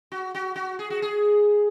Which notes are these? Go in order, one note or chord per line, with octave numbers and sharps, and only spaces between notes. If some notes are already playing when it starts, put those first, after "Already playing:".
F#4
F#4
F#4
G#4
F#4
G#4